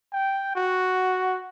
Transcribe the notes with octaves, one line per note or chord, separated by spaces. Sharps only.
G5
F#4